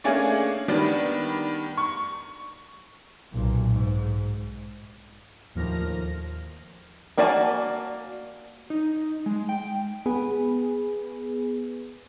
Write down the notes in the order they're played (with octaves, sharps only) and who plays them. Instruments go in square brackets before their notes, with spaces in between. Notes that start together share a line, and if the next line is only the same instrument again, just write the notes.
[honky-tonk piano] A3 A#3 C#4 D4 G#4
D#3 G3 B3 D4
C#6
[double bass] B1 A#2
G#2
[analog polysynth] D#2 A2 F3 A#3 F6 A#6
[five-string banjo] A#3 F#4 D5 G#5 A5
[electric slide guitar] D#4
G#3
G5
[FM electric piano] B3 G#4 B4